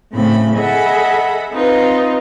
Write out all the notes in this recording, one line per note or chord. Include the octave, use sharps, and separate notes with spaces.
A2 C#3 A3 C4 B5
G#4 A4 D#5 E5 F#5 B5
C4 D#4 F4 B4